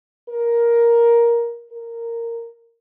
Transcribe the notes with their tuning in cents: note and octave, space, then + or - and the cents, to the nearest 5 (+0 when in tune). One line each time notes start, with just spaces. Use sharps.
A#4 +10
A#4 -10